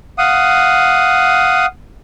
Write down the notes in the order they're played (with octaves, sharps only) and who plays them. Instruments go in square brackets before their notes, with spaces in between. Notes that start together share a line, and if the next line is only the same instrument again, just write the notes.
[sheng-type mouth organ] F5 F#5 D#6